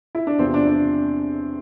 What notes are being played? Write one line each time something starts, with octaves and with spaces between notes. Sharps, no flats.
E4
D4
E2 C3 F3 C4
D4
D4